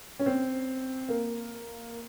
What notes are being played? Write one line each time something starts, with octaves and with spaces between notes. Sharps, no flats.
C#4
C4
A#3